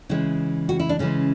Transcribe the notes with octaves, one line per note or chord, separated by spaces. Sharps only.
C#3 E3 G#3 E4
F#4
E4
D4
C#3 E3 G#3 C#4